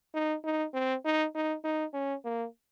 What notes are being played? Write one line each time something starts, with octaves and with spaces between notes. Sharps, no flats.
D#4
D#4
C4
D#4
D#4
D#4
C#4
A#3